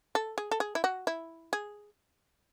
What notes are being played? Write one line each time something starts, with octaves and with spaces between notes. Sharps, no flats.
A4
G#4
A4
G#4
E4
F#4
E4
G#4